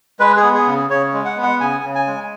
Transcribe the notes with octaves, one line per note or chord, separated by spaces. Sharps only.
G#3 B4
G#4
B3
G#4
C#3
C#3 C#5
G#3
F#5
B3
F#5
C#3 G#5
C#3
G#5
G#3